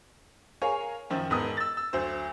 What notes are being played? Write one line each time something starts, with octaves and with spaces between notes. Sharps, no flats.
G#4 A#4 C#5 F5 G#5
F#2 D#3 F3
E1 G#2 B3 D#6
E6 A6
E6
D2 F#3 C5